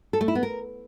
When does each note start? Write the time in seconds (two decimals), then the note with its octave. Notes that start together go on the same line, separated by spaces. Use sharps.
0.13 A4
0.21 A3
0.28 E4
0.35 B3
0.43 A#4